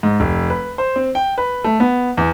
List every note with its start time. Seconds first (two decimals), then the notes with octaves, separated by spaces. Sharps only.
0.03 G#2
0.20 F1
0.50 B4
0.78 C5
0.96 C4
1.15 G5
1.38 B4
1.64 A3
1.80 B3
2.17 E2